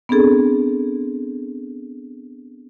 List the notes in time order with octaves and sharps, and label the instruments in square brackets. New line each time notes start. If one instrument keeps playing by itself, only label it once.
[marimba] B3 C4 D4 G#4 A4